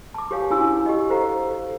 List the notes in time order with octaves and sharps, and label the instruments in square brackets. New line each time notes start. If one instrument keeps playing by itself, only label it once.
[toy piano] A5 D6
G4 A#4 C#5 F5 G#5
C#4 D4 E4 F#4 G#5 E6
G4 D#5
A4 C5 D#5 F5 F#5 A#5